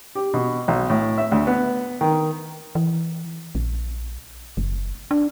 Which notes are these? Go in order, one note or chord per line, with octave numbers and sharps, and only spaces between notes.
G4
B2
B1
A2
E5
D2
B3
D#3
E3
A#1
F#1
D4